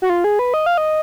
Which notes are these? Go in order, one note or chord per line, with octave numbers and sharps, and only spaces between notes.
F#4
F4
G#4
B4
D#5
F5
D#5